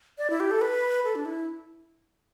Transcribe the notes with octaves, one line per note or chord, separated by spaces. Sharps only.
D5
E4
G4
A4
B4
A4
D4
E4